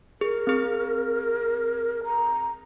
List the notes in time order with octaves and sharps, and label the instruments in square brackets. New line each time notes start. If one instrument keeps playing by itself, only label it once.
[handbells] G#4 [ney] A#4
[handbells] C4 G#4
[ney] A#5